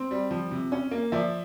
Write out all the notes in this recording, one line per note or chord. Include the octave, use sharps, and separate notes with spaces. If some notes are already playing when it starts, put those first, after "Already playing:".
Already playing: C4
G3
F3
C3
C#4
A#3
F3 D5 E5